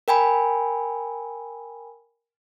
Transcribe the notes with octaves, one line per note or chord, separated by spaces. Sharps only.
A#4 G5 G#5 B5